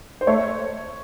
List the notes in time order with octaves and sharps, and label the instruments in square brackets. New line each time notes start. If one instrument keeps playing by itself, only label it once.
[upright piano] C5
[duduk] A3 [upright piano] C#5